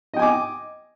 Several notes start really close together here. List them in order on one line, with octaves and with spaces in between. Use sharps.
D#5 G5 G#5 D6